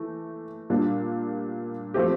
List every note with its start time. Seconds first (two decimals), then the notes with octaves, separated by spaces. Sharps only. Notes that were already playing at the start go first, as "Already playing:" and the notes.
Already playing: E3 A3
0.70 A#2 G3 D4
1.94 F3 A3 C4 G4